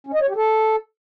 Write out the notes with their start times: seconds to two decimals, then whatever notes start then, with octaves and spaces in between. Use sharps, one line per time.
0.07 C#4
0.14 D#5
0.21 C#5
0.29 G4
0.36 A4